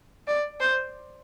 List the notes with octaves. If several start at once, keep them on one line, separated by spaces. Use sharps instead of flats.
D5
C5